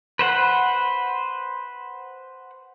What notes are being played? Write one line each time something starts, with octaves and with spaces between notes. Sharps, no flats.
B4 C5 F#5